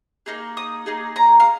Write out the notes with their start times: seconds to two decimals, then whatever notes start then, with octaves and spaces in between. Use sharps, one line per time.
0.26 A#3 D#4 G#4
0.57 D#6
0.86 A#3 D#4 G#4
1.16 A#5
1.40 F5